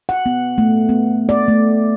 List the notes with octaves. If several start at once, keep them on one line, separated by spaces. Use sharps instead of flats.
F#5
B3
A3
B3
D5
A3